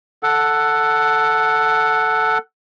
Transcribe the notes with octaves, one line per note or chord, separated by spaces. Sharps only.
A4 F#5